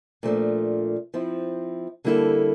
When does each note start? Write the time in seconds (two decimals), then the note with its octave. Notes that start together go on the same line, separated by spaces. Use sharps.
0.23 A#2 F3 A3 D4
1.14 F3 C4 E4
2.05 D3 G3 A#3 E4 A4